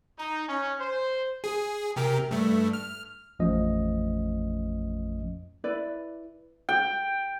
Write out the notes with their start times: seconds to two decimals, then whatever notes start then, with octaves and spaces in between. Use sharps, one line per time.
0.19 D#4
0.48 C#4
0.80 C5
1.44 G#4
1.96 C3 G4 A#4
2.31 G2 A3
2.73 F6
3.39 A1 F2 F3 A3 C#4 D#5
5.64 E4 B4 D5
6.69 G5